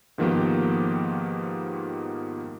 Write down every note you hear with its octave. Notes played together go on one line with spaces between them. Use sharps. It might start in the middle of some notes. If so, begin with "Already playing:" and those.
G#2 D#3 F3 A#3 B3 G4